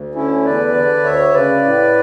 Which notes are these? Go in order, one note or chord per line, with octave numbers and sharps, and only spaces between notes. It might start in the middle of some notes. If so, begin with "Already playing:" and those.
Already playing: D2
D3 C#4 E4
E2 B4 D5
D3
D2 C#5 E5
C#3 B4 D5
A2